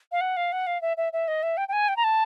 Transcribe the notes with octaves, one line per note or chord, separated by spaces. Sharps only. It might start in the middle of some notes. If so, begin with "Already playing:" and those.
F5
F#5
F5
F#5
F5
E5
E5
E5
D#5
E5
G5
G5
G#5
G5
A#5
A5